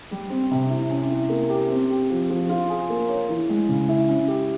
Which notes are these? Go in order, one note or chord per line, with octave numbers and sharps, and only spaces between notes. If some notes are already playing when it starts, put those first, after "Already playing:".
G3
C4
C3
E4
C#4
E4
A#3
G4
C4
G4
F3
F3
F4
G#4
A#3
C#5
E3
G#3
C#3
E4
C#4
G4